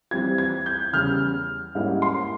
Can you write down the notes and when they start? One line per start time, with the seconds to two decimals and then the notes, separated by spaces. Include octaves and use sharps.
0.11 E3 G3 C4 F4 G#6
0.38 G#6
0.66 G6
0.93 E2 C#3 G3 F6
1.75 G#2 G3 A#3 C#4 E4
2.02 C6